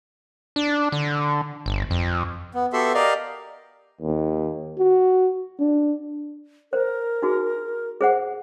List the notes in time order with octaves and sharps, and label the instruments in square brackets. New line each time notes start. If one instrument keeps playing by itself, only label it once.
[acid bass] D4
D3
G1
F2
[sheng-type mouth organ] B3
B3 F#4 G4 A4 E5 C6
G4 A#4 D5 D#5 F5
[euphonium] D#2
F#4
D4
[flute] A#4 [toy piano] C5
[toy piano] D#4 F#4 G#4
G#4 C5 F#5